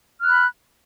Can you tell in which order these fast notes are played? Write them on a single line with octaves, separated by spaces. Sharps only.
F6 F#6 B5